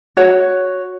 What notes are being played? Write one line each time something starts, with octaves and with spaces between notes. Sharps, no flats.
F#4 C#5